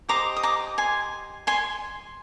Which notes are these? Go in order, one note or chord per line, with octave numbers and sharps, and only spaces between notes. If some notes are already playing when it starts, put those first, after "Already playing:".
G4 C5 D#5 A#5 D6
D#6
A#5 D6
G#5 C6
G#5 C6